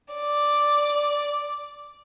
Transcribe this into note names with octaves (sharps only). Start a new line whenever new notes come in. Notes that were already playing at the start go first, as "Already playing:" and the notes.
D5